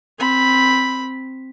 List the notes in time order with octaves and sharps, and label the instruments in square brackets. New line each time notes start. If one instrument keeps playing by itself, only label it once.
[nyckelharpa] C4 B5